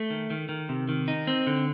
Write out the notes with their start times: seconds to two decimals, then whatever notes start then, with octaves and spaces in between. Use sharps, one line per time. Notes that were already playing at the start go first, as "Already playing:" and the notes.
Already playing: A3
0.10 D#3
0.30 D#3
0.49 D#3
0.69 C3
0.89 D#3
1.08 D#4
1.27 C4
1.47 D3